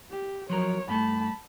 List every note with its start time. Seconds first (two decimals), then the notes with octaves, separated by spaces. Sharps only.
0.10 G4
0.49 F3 F#3 A#4 C#5
0.88 G2 A3 A5 B5